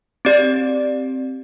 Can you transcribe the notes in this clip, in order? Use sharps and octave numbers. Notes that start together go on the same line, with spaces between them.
C4 G4 D5